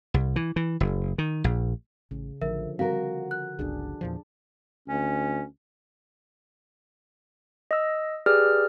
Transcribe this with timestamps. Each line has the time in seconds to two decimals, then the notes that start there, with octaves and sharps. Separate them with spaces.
0.14 C2
0.36 E3
0.56 E3
0.80 F#1
1.18 D#3
1.44 A#1
2.11 A1 C#3
2.42 A1 D3 F3 A#4 E5
2.79 G3 C4 F#4 A#4 F5
3.31 F#6
3.59 G1 C#2 D4 G#4
4.01 E2 A#2 F3
4.88 D2 C#4
7.71 D#5 E6
8.26 G4 G#4 B4 D5 F6